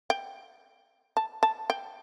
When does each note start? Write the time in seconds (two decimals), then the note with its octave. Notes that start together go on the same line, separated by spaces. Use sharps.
0.10 G5
1.17 A5
1.43 A5
1.70 G5